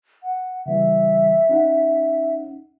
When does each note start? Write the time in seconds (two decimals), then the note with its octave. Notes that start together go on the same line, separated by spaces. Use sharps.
0.23 F#5
0.66 C#3 E3 G3 E5
1.49 C#4 D#4 F#5